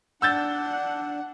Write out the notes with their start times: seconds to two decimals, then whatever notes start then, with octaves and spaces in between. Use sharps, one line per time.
0.22 D4 F#5 E6 G6 A6